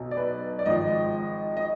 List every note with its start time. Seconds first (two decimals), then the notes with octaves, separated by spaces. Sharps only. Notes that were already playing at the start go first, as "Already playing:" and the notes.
Already playing: B1 B2 F#3
0.11 D5
0.17 B4
0.59 D5
0.66 G#1 G#2 F3 D#5
1.57 D#5